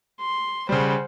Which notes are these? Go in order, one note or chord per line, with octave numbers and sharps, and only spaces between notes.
C6
C#3 G3 C5 F#5